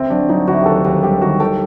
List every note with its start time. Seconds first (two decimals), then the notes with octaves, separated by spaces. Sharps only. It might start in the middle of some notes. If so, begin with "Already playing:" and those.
Already playing: D2 C4
0.10 F#3 D4
0.29 F#3 D#4
0.47 D2 F#4
0.62 G4
0.66 D#2 A4
0.84 D#2 G4
1.03 G3 G4
1.21 D#3 F#4
1.40 G4 A4